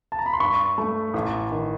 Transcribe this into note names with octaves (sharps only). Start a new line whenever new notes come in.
A5
A#5
B5
C6
G2 B5 C#6
A3
A1
D#3